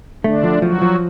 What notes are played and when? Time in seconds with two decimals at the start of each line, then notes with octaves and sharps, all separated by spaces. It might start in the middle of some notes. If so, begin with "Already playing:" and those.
0.24 D3 A3 D4
0.44 F3
0.62 F3 F#3 F#4
0.82 F3